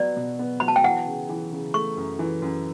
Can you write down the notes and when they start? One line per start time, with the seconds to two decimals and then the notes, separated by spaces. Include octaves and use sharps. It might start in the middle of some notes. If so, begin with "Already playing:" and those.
Already playing: F#3 B3 D5
0.16 B2
0.39 B3
0.60 F#3 B5
0.68 A5
0.76 G5
0.84 E3 F#5
1.06 C#3
1.29 E3
1.52 C#3
1.74 A3 C#6
1.97 F#2
2.19 E3
2.42 F#2